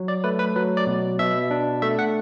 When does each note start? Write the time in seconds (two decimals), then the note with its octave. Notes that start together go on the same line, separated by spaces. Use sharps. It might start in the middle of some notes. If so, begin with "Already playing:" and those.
Already playing: F#3
0.08 D5
0.24 A3 B4
0.39 B4
0.56 F#3 B4
0.77 D5
0.87 B2
1.19 B2 E5
1.51 D4
1.82 A3 E5
1.99 F#5